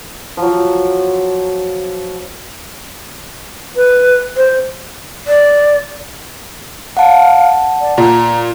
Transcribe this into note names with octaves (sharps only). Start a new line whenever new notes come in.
F3 F#3
B4
C5
D5
F5 F#5 A5
D5
A#2 A#5